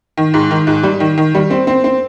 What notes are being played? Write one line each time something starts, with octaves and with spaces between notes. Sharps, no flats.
D#3
G#2
D#3
G#2
G3
D#3
D#3
G3
C4
C4
C4